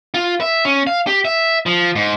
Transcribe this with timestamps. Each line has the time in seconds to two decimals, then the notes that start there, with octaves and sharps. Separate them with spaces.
0.14 F4
0.41 E5
0.65 C#4
0.87 F5
1.07 G4
1.25 E5
1.66 F3
1.96 G#2